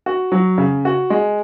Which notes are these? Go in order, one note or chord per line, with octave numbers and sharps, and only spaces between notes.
F#4
F#3
C#3
F#4
G#3